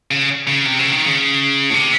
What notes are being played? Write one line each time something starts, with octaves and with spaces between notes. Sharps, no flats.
C#3
C#3
C3
C#3
D#3
C#3
A2
C3